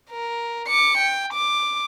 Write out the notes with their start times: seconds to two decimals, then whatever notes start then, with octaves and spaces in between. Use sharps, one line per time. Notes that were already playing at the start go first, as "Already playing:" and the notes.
0.11 A#4
0.68 D6 C#7
0.98 G5
1.33 D6